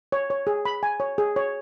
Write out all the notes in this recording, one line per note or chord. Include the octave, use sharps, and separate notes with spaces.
C#5
C#5
G#4
B5
G#5
C#5
G#4
C#5